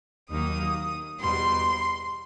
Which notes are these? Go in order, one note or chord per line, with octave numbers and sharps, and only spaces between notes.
D#2 D#3 F#3 A#3 D#4 D#6
E2 B2 G3 C6